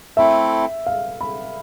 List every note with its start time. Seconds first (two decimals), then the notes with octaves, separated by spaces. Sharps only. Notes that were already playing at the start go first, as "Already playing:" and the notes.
0.17 A3 C4 E4 A4 E5
0.86 F5
1.21 B5